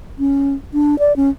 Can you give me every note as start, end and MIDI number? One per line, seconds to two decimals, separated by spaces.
0.19 0.54 61
0.73 0.98 62
0.99 1.16 74
1.16 1.30 61